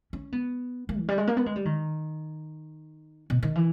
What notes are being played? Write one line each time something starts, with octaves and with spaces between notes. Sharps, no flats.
C#4
B3
A#3
E3
G3
G#3
A#3
B3
G#3
G3
D#3
B2
D#3
E3